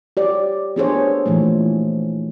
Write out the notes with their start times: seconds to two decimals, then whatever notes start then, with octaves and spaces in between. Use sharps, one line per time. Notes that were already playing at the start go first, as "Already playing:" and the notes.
0.17 G4 C#5 D5
0.76 B3 D4 G#4 A4 C5 C#5
1.26 A#2 E3 F3 A3